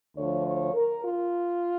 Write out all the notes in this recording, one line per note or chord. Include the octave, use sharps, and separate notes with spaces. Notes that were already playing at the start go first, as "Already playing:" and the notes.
D2 D3 F3 C#5
C#5
A#4
F4